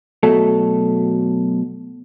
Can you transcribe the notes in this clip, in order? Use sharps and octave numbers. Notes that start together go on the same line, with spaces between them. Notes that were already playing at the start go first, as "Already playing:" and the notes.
B2 F#3 A3 A4